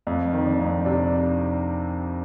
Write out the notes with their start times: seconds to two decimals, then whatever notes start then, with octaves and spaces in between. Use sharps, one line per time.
0.07 F2
0.33 D#3
0.46 D4
0.60 F2
0.85 C3 D4